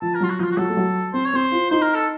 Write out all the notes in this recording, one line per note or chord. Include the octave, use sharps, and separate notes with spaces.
F3 A5
A#4
F#3 F4
F#4
F3 D#4 F4
F#4
F#3 A4
A3
F#3
C4 C5
C#5
C4 C5
F4
D#4 C5
A#4
A4